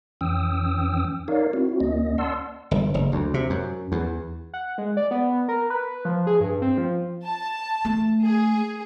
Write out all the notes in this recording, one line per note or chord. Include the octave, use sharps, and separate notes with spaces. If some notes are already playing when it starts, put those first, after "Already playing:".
F2 E3 C#4 G5 D#6 E6
D#4 A#4 C#5 D5 F5
C4 E4 F#4
D2 A#3 C#4 D#5
D5 F#5 A5 C6 E6
G1
F#1
D2
C3
F#2
E2
F#5
G#3
D5
B3
A#4
B4
F3
G#4
G2
C4
F3
A5
A3
G#4